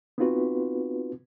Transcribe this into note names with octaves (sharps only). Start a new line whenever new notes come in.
B3 C4 D#4 F4 F#4 B4